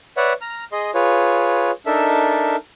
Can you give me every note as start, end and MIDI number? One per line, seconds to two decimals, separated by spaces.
0.17 0.33 71
0.17 0.33 73
0.17 0.33 74
0.17 0.33 76
0.17 0.33 78
0.41 0.64 82
0.41 0.64 89
0.72 0.91 68
0.72 0.91 75
0.72 0.91 84
0.94 1.71 65
0.94 1.71 68
0.94 1.71 71
0.94 1.71 73
1.86 2.56 62
1.86 2.56 63
1.86 2.56 69
1.86 2.56 70
1.86 2.56 76